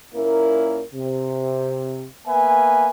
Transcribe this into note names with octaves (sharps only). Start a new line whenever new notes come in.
A#2 A#3 C#4 E4 A#4
C3
A#3 B3 B4 E5 G#5